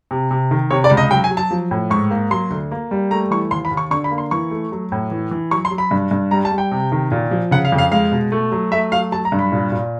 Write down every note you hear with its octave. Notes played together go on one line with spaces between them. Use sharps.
C3
C3
D#3
C3 C#5
D5
C#2
D#5
F#3 G5
G#5
F#3
A5
F3
A2
G#2 C#6
A#3
F#3 C6
D2
A#3
G3
A3 A#5
E3 C#6
D#2 C6
B5
D#2
C#6
D3 C#6
B5
A#3
C6
E3 C#6
A3
F#3
A2
E3
E3
F#3 C#6
C6
F#3
B5
G2
G2
G3 A#5
A5
G3
G5
C3
D#3
A#2
F3
C#3 F#5
F5
F2
F5
G#3 F5
B2
A3
F#3
A3 E5
F#3 F5
F#3 A5
A#5
G2
B5
A#2
A#2